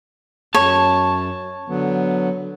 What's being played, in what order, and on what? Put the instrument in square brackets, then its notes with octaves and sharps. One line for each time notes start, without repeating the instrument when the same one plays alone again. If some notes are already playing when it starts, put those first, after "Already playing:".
[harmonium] F#2 [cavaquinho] C#5 [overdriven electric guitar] A5
[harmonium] D3 F#3 B3